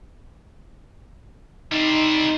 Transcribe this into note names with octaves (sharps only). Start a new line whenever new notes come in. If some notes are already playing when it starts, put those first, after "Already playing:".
G3 C4 D#4